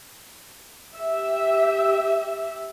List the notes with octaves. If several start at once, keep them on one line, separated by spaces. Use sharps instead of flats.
G4 E5